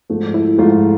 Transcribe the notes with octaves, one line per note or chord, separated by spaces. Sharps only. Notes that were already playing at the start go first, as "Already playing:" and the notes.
G#2 F3 A3
E4
G#2 F3 A3 F4